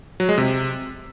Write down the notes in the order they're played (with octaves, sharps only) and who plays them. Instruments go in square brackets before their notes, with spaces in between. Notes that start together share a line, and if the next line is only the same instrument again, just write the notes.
[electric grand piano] F#3
G#3
C3